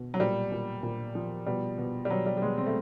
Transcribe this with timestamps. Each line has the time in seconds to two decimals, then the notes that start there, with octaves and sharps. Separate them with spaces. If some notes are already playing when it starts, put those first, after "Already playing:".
Already playing: B2
0.14 F#3
0.20 A#2 G3
0.52 A#2
0.83 A#2
1.15 F3
1.46 B2 G3
1.78 B2
2.05 G3
2.10 B2 F#3
2.26 G3
2.37 G3
2.42 B2 G#3
2.57 C4
2.66 A3